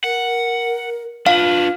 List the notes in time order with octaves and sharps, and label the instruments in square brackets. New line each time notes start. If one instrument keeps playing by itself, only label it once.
[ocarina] A#4 [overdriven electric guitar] F#5
[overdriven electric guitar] D4 B4 [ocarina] F4 [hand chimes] F5